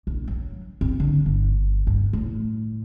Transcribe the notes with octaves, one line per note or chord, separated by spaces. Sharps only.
A#1
F#3
C4
D3
G1
G2
A2